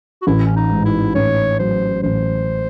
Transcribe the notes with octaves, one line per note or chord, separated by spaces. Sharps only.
F#4
A1 E4
C#4
D#4
G#2
E4
A1 C#5
F#3 C5
A1 C5